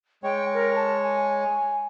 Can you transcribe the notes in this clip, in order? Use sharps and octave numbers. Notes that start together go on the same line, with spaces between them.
G#3 C#5 G5
A#4
A5
G#5